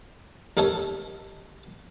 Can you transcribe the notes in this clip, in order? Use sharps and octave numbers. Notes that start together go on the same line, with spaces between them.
D#2 D#4 A4 C5 C#5